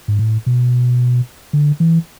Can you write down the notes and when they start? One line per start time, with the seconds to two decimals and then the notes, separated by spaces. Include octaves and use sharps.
0.08 G#2
0.19 A2
0.46 B2
1.53 D3
1.80 E3